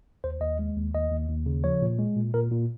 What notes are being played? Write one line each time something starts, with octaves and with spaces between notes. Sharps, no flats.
D#2 C5
D#2 D#5
G#3
D#2
D#2 D#5
D#2
D#2
C#3
F3 C#5
A#2
G#3
A#2
A#2 A#4
A#2